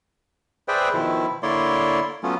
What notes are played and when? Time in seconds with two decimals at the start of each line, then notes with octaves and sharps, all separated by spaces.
0.68 G#4 B4 C5 D5 E5 G5
0.94 B2 D#3 F3 E4
1.43 D3 A#3 E4 C#5 D5 C6
2.23 F#3 A3 B3 C#4 F4